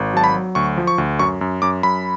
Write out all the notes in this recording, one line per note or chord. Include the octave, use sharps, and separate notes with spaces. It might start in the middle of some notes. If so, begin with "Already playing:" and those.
Already playing: G#1
F#3 A5
B5
F#3
D2 C#6
F3
C#6
D2
F#2 C#6
F#2
F#2 D6
F#2 B5